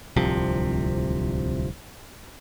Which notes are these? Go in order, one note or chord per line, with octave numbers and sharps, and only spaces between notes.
D1 C2 C3 F3